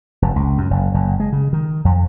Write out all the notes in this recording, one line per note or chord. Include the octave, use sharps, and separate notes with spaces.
F1
C#2
F#2
F#1
F#1
G#3
C#3
D#3
F2